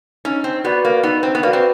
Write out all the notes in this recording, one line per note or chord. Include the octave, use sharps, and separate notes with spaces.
C#4 D#4
C4
B3 F#4 B4 D5
A#3
B3 D#4
C4
B3
A#3 F#4 B4 D5
C4